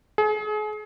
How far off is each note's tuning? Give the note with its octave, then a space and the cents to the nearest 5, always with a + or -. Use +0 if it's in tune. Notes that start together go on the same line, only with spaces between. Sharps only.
G#4 +35